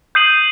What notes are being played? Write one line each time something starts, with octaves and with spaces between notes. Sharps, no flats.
D#6 G6 C7 D#7 F#7